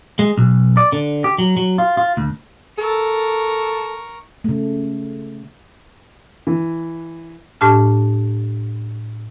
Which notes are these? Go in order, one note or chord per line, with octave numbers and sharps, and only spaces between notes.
G#3
B1
D5
D3
G4
F#3
F#3
F4
F4
D2
A4 A#4 C#6
C#3 A3
E3
A2 D4 G4 A5 F6